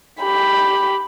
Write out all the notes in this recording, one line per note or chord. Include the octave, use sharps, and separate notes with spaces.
G4 B5